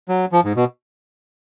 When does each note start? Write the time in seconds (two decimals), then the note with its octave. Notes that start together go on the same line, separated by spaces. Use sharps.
0.08 F#3
0.32 F3
0.44 G#2
0.56 B2